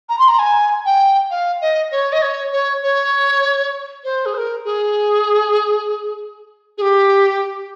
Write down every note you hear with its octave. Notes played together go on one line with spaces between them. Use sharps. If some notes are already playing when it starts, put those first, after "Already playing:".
A#5
C6
A#5
G#5
G5
F5
D#5
C#5
D#5
C#5
C#5
C#5
C5
G#4
C5
A#4
G#4
G#4
G4